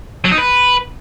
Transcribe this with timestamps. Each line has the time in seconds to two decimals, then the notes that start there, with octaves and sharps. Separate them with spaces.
0.25 F#3
0.31 D#4
0.38 B4